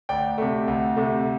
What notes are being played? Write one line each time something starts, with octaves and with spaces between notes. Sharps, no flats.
D2 D5 G5
C3 A3
D2
C3 A3